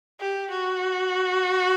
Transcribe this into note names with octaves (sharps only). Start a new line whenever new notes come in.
G4
F#4